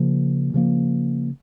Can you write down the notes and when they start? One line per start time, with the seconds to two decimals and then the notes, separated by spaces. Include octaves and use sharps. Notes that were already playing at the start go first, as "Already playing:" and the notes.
Already playing: C#3 F3 A#3
0.54 C#3 F3 A#3